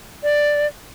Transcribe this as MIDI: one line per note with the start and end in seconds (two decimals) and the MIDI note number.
0.23 0.67 74